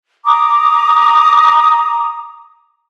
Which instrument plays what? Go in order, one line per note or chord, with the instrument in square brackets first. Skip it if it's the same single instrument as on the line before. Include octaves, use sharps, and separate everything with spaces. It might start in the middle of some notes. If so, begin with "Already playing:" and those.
[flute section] A#5 D6 D#6